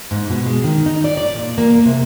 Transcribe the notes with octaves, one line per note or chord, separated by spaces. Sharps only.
G#2
B2
G#3
D#3
D#4
D5
D5
A#2
A#3
C3